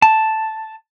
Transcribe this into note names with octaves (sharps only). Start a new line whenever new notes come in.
A5